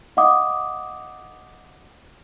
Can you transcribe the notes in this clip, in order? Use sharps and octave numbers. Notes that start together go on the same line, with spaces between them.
D#5 F5 F#5 D6 D#6